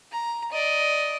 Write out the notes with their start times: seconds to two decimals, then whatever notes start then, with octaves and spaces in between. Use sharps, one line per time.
0.11 A#5
0.52 D5 D#5